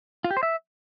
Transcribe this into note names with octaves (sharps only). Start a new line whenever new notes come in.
F4
G4
C5
E5